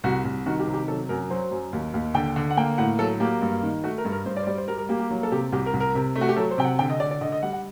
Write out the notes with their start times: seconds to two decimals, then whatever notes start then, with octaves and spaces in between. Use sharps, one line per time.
0.04 C2 F#4
0.25 C2
0.46 D#3 F#4
0.60 G4
0.67 C3
0.73 G4
0.88 F#3 A4
1.09 F#2 A#4
1.30 F#3 C5
1.51 F#2
1.73 D#2
1.94 D#2
2.14 D3 G5
2.36 D3
2.50 F#5
2.57 A#3 G5
2.78 A2 F#5
2.99 F#3 A4
3.20 A#3 G4
3.42 G2
3.63 D#3
3.84 A3 F#4
3.98 A#4
4.05 G2
4.12 A#4
4.26 G2 C5
4.37 D5
4.43 C5
4.47 G3 D5
4.58 C5
4.68 G3 A#4
4.78 A#4
4.89 A#3 G4
4.99 G4
5.10 F#3
5.23 A4
5.31 C3 G4
5.52 C2 G4
5.66 A#4
5.73 C2
5.80 A#4
5.95 C3
6.16 A3
6.21 F#4
6.29 G4
6.36 F#3 A4
6.51 C5
6.58 C3 G5
6.65 F#5
6.79 D3 G5
6.90 D#5
7.00 D3 D5
7.11 D5
7.21 D3 D#5
7.32 D#5
7.42 G3 F#5
7.53 F#5